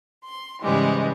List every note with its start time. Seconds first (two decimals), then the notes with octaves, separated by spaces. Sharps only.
0.23 C6
0.62 G#2 C#3 E3 G3 G#3